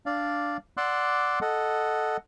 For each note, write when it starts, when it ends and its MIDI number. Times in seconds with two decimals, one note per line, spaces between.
0.06 0.57 62
0.06 0.57 74
0.06 0.57 77
0.77 1.39 74
0.77 1.39 78
0.77 1.39 84
0.77 1.39 86
0.77 1.39 88
0.77 1.39 90
1.42 2.17 69
1.42 2.17 75
1.42 2.17 78